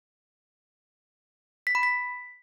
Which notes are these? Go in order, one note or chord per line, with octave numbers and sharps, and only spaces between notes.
B6
B5
B6